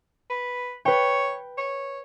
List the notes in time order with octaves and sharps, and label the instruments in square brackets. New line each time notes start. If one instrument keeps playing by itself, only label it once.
[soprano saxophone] B4
[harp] B4 G5 [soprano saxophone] C#5
[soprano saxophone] C#5